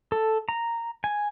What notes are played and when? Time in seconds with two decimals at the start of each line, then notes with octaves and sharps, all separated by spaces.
0.12 A4
0.49 A#5
1.04 G#5